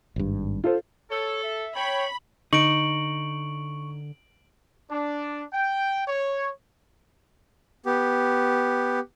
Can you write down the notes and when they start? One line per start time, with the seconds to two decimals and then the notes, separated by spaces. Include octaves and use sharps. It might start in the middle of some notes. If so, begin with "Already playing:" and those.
0.16 G#1 G2
0.64 F4 A4 C5
1.11 A4 C#5
1.44 E5
1.75 C#5 G5 B5
2.53 D3 D#4 C#6 D7 F#7
4.90 D4
5.54 G5
6.08 C#5
7.86 B3 G4